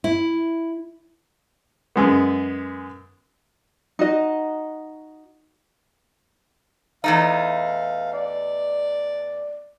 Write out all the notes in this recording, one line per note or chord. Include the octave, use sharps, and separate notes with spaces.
E4
F#2 G#3 B3
D#4 F#4 D#5
E2 A3 D#4 F5
D5